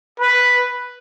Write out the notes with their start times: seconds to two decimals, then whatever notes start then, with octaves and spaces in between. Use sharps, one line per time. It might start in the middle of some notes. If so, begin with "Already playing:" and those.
0.20 B4